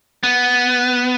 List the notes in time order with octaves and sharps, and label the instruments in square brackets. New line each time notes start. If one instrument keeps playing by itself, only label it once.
[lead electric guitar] B3